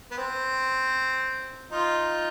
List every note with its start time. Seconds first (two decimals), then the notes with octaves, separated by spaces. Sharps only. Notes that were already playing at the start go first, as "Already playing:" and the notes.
0.11 B3
0.17 C4
1.71 D#4 F4